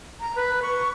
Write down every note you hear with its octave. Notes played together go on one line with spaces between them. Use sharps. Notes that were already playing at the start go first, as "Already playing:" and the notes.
A#5
B4
C#6